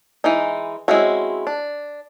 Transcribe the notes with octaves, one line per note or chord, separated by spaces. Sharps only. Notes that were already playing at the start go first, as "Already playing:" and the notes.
E3 G#3 D#4
G#3 C4 C#4 E4 F#4
D4